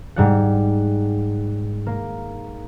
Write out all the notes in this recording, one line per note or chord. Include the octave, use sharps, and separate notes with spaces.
G#2 G3 F#5
A#3